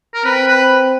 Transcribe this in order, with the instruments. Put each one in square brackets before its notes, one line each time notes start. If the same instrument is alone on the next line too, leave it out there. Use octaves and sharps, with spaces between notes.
[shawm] A#4
[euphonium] C4 [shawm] B4
[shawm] B4